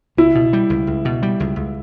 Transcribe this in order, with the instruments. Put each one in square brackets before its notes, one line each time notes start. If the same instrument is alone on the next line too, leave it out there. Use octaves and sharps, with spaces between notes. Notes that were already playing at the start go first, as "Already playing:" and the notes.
[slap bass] C#2 [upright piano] E4
[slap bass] B2
G3
C#2
C#2
B2
G3
C#2
C#2